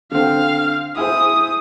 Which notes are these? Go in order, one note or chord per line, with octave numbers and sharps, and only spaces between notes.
D3 C4 F5
E4 G#4 C5 D#6